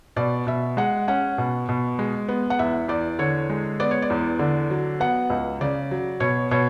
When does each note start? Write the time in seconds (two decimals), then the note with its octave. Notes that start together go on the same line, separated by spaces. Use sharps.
0.16 B2 D5
0.47 B2 E5
0.77 G#3 F#5
1.08 C#4 F#5
1.38 B2
1.69 B2
1.99 G#3
2.29 B3
2.50 F#5
2.59 E2 E5
2.88 E2 D5
3.19 D3 C#5
3.50 G#3
3.80 B3 D5
3.91 C#5
4.02 D5
4.10 E2
4.39 D3
4.70 F#3
5.00 B3 F#5
5.30 C#2
5.61 C#3 D5
5.91 F#3
6.20 B2 C#5
6.51 B2 C#5